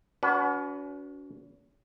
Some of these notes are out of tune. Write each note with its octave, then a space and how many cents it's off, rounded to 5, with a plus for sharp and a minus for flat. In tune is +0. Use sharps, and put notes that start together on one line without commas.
C#4 +45 F#4 +0 B4 +0